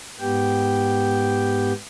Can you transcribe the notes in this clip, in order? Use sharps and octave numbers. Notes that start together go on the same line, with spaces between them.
G#2 B3 G4 G5